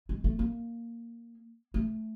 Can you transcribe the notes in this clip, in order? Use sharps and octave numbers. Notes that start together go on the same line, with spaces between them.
G#3
A3
A#3
A3